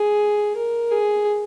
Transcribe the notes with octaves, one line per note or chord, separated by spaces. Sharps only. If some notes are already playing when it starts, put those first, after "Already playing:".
Already playing: G#4
A#4
G#4